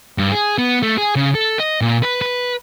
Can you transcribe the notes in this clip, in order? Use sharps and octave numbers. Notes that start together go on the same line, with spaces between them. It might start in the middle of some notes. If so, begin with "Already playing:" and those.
G2
G#4
B3
A3
G#4
C#3
A4
D#5
A#2
B4
B4